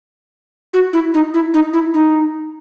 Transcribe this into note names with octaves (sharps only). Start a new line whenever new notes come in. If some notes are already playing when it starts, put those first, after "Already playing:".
F#4
E4
D#4
E4
D#4
E4
D#4